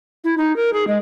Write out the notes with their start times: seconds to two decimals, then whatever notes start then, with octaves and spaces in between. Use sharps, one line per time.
0.24 E4
0.38 D#4
0.56 A#4
0.73 G#4
0.88 G#3